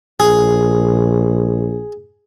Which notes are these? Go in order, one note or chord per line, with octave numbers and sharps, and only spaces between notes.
A#1 G#4